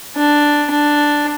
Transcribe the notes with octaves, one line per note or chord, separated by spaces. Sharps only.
D4
D4